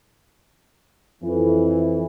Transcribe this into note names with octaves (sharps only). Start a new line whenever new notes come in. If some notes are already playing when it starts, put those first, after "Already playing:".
F2 E3